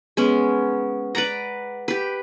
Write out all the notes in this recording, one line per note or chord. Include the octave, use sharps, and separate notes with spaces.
G#3 B3 C#4
B4 D5 F#5 A#5
G4 B4